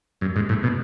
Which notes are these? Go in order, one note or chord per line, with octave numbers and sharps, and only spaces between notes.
F#2
G#2
A2
B2